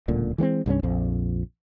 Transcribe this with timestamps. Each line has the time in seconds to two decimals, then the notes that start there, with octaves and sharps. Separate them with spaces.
0.08 D1 C#2 A#2 D3
0.38 E3 G#3 B3 C4
0.66 C2 G2 A3 C#4
0.83 A#1 F2 F3